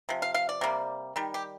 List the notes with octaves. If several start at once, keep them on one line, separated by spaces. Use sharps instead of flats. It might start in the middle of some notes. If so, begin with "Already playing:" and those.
C3 F3
F5
F5
D5
C3 G3 A#3
D#3 G3
G4